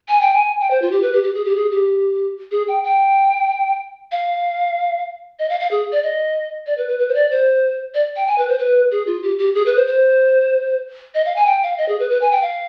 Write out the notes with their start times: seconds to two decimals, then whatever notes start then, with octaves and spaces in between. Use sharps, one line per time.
0.08 G#5
0.21 G5
0.34 G#5
0.60 G5
0.71 C5
0.82 F4
0.92 G4
1.03 B4
1.13 G4
1.23 G4
1.35 G#4
1.45 G4
1.56 G#4
1.72 G4
2.51 G#4
2.68 G5
2.84 G5
4.12 F5
5.39 D#5
5.50 F5
5.60 F5
5.71 G#4
5.92 D5
6.03 D#5
6.67 D5
6.78 B4
6.89 B4
6.99 B4
7.08 C5
7.15 D5
7.31 C5
7.94 D5
8.16 G5
8.27 G#5
8.38 B4
8.49 C5
8.59 B4
8.91 G#4
9.07 F4
9.23 G4
9.39 G4
9.55 G#4
9.66 B4
9.76 C5
9.87 C5
11.15 D#5
11.26 F5
11.36 G#5
11.46 G5
11.63 F5
11.78 D#5
11.89 G#4
12.00 B4
12.10 B4
12.21 G#5
12.32 G5
12.42 F5